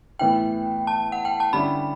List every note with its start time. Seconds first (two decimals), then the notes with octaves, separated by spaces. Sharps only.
0.19 A2 E3 B3 E4 G5
0.87 A5
1.12 F#5
1.25 G5
1.40 A5
1.53 D3 G3 C#4 E4 B5